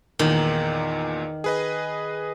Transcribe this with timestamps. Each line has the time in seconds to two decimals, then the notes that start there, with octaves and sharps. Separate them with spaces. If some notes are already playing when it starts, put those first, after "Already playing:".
0.19 E2 A#2 D#3
1.44 G#4 B4 D#5